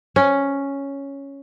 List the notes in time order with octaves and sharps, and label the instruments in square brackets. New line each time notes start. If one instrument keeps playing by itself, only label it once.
[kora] C#4